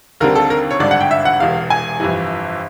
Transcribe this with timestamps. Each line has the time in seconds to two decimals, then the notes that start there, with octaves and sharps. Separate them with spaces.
0.20 D#2 D3 G3 C4 A#4
0.35 A4
0.50 A#4
0.71 C#5
0.80 G#1 G2 D3 D5
0.91 F#5
1.01 G5
1.11 E5
1.25 F#5
1.40 E1 E2 C3 F5
1.70 G#5
2.00 G1 F2 C3 E3